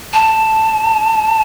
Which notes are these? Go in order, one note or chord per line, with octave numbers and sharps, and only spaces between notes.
A5